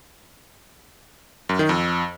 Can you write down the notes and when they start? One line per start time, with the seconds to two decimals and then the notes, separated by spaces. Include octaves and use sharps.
1.49 F#2
1.59 D#3
1.69 F2